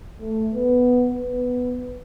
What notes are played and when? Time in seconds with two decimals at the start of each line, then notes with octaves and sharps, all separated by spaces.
0.20 A3
0.54 B3
1.22 B3